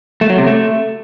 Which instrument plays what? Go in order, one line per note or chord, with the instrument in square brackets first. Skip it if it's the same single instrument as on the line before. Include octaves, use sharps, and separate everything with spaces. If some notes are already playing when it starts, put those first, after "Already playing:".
[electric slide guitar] A3
F#3
C3
A3